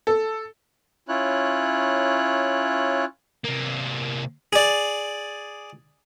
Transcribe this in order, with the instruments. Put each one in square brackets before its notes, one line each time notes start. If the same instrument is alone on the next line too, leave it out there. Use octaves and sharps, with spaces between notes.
[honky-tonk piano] A4
[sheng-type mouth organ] C#4 E4 F4 C#5 F#6
[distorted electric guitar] C3 A#3
[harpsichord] G#4 D5